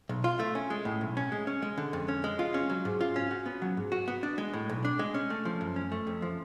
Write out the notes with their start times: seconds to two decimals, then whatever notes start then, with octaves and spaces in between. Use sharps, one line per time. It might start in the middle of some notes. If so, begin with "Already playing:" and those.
0.09 B1
0.24 F4
0.39 A3
0.55 C#4
0.70 G#3
0.85 A2
1.01 B1
1.17 C#4
1.32 G#3
1.47 C#4
1.62 G#3
1.78 D3
1.93 F2
2.08 C#4
2.24 G#3
2.39 F4
2.54 C#4
2.70 F#3
2.85 G#2
3.01 F4
3.16 C#4
3.31 F#4
3.46 B3
3.62 F#3
3.77 G#2
3.92 F#4
4.08 B3
4.23 D4
4.38 G#3
4.53 A2
4.70 B1
4.85 D4
4.99 G#3
5.14 C#4
5.30 A3
5.45 F3
5.61 F#2
5.76 C#4
5.92 A3
6.07 F2
6.22 F3